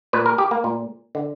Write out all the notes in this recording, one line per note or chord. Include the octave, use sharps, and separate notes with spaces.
A#2 B4
A#4
G4
A#3
A#2
D3